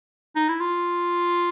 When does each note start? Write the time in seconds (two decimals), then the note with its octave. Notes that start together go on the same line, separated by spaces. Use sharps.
0.36 D#4
0.49 E4
0.61 F4